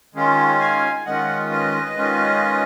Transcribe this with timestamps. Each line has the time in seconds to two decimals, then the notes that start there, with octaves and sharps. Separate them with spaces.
0.15 D#3 G#3 C#4 F4
0.60 F5 G#5
1.05 D#3 G#3 C#4 F4 D#5 F#5
1.51 B4 D#5
1.97 D#3 G#3 C#4 F4